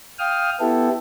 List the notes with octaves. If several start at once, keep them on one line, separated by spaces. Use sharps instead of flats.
F5 G5 D#6 F6
B3 E4 G4 A4